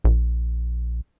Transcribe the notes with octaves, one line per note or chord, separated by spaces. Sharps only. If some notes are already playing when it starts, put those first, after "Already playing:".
A#1